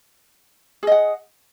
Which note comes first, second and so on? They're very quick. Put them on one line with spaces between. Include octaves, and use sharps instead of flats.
G#4 D#5 F#5